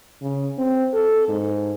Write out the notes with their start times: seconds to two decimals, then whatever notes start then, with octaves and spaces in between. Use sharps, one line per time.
0.22 C#3
0.58 C4
0.94 A4
1.29 G#2